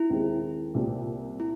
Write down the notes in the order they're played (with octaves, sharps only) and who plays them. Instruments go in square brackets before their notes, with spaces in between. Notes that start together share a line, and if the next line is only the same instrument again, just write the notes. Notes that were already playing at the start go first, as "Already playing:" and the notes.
Already playing: [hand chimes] E4
[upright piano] D#2 D#3 G#3 C4
C2 A#2 G3 C4
[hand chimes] E4